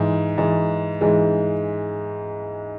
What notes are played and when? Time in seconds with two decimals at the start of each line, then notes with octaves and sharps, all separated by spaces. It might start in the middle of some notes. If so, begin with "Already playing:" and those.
Already playing: G#2 E3 G#3
0.38 G#2 E3 G#3
1.01 G#2 E3 G#3